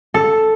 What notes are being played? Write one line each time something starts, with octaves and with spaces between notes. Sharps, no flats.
A4